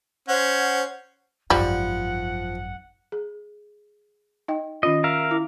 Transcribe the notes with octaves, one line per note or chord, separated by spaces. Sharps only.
C#4 C5 F#5
G#1 F#2 F3 G3 F#5
G#4
D#4 D#5 G5
D#3 C#4 F4 D#5
A#4 E5 F5
E4